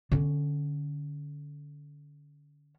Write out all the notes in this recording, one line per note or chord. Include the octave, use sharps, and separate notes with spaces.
D3 C#4